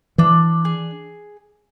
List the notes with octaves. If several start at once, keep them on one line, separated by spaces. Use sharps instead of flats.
E3 D4
G#4